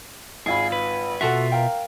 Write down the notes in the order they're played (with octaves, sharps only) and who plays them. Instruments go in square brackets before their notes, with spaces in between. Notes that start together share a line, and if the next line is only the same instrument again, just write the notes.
[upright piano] G#1 F4 B5 [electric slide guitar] G#4
[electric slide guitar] B4
[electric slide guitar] B2 F4 E5 [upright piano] F#4 A4 F#5
[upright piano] A#4 F5 G5